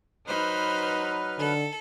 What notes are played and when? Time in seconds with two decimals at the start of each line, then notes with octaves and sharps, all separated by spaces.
0.27 F#3 D#4 B4 C5 B5 F6
1.39 D3 A4